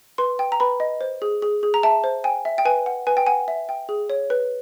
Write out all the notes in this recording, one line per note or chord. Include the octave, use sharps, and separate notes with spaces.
B4 C6
G5
A#5
B4 B5
D#5
C5
G#4
G#4
G#4
A#5
E5 A5
C5
G5 G#5
E5
G5
B4 G#5
F#5
B4 G#5
G5
F#5 G#5
E5
G5
G#4
C#5
B4